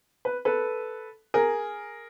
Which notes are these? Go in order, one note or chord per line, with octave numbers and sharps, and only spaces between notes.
B4
A4 B4
G#4 A#4